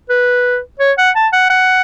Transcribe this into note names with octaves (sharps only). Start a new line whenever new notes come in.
B4
C#5
F#5
A5
F#5
F#5